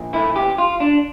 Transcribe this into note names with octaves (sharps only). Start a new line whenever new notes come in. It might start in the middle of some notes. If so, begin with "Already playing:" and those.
Already playing: A#2 F3 A#3
E4
G4
F4
D4